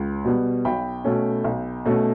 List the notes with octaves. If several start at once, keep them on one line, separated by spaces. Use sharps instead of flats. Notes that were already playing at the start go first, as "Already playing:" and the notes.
Already playing: C#2
B2 G3 B3
B1 G5 B5
B2 A3 C#4
B1
B2 A3 C#4